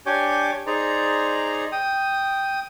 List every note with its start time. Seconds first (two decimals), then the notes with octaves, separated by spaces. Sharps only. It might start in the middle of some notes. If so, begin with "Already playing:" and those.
0.06 D4 G4 C#5 G#5 D6 G6
0.67 D#4 G#4 C5 D5 A#5
1.72 G5 D#6